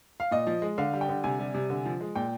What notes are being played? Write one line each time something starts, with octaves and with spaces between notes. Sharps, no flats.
F5
A#2 D#5
F3
G#3
D3 F5
G3
G5
D3
C3 G#5
G3
C3
D3
F3
G#3
A#2 G5